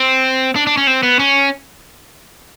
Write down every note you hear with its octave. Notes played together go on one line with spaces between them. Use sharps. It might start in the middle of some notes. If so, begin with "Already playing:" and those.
Already playing: C4
D4
D4
C#4
C4
B3
C#4